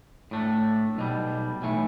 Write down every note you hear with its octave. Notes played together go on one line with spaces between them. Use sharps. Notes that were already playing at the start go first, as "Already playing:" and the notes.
A2 A3 D4
B1 B2 G3
B1 A2 E3 A3